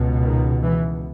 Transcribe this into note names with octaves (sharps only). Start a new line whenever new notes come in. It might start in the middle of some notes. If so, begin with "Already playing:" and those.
Already playing: C#2 B2
D#3
E3